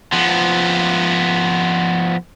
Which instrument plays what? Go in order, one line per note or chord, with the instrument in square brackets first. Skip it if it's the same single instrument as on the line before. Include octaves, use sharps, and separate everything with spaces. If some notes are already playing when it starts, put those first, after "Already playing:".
[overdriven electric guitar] F3 B3